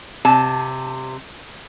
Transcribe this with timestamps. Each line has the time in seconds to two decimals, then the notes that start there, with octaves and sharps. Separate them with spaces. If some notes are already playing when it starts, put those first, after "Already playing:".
0.25 C3 A5